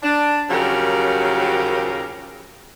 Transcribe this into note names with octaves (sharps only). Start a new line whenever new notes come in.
D4
D#2 C#3 F3 F#3 G4 A#4